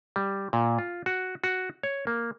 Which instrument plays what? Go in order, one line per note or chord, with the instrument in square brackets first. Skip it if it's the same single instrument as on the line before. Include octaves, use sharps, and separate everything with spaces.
[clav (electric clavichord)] G3
A#2
F4
F#4
F#4
C#5
A#3